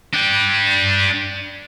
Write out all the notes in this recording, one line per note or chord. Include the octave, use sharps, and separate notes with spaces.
D4 G5